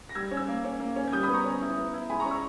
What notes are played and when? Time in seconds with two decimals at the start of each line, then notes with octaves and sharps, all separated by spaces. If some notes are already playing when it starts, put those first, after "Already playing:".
0.09 A#6
0.15 G3 E6 G#6
0.31 C#4
0.37 E6 G#6
0.48 A#3
0.64 C#4
0.80 A#3
0.96 C#4
1.08 G#6
1.12 G3 D#6 G6
1.23 B5 D#6
1.28 B3
1.34 A#5 C#6
1.44 C#4
1.62 E4
1.78 B3
1.94 E4
2.10 G#3 G#5 B5
2.20 A#5 C#6
2.25 C#4
2.31 C#6 E6